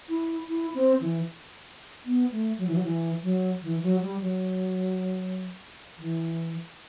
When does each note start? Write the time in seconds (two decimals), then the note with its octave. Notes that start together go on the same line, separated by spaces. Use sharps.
0.09 E4
0.48 E4
0.74 C4
1.01 E3
2.05 B3
2.31 A3
2.58 F#3
2.67 E3
2.75 F#3
2.83 E3
3.23 F#3
3.63 E3
3.83 F#3
4.02 G3
4.21 F#3
5.98 E3